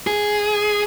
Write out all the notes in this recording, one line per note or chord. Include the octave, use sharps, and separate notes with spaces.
G#4